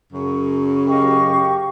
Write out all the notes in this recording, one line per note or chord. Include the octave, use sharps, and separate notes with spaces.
F#2 C#3 C#6
G4 D#5 F5 C#6